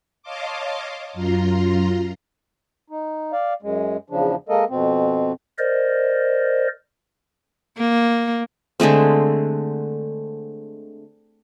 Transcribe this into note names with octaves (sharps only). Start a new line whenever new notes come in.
C#5 D#5 F5 A5 C6 D6
F#2 F4 A#5 C6
D#4
D5 F5
F#2 G#3
E2 C#3 F3 D4
G#3 A#3 A4 A#4 D#5
F2 B2 C4
A#4 C5 D5 D#5
A#3
D3 G#3 A3 C4